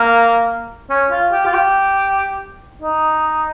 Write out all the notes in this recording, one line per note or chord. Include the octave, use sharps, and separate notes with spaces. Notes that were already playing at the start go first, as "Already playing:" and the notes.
Already playing: A#3
C#4
F4
G4
F4
G4
D#4